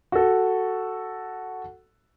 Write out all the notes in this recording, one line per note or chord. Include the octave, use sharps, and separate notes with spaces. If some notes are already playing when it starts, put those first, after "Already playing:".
F#4 A4